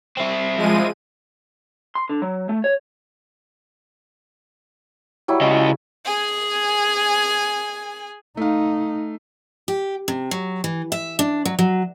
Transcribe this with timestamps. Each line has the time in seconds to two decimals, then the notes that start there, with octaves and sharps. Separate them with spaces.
0.17 C4 E4
0.56 F3 G#3 D#7
1.95 C6
2.09 D3
2.22 F#3
2.49 A3
2.64 C#5
5.28 F#3 G3 E4
5.41 C#3 D#5
6.05 G#4 G#5
8.37 A3 D#4 F5
9.68 G4
10.08 C3
10.31 F#3
10.64 E3
10.92 E5
11.19 D4
11.45 F#3
11.59 F#3